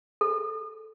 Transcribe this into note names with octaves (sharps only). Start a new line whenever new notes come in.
A4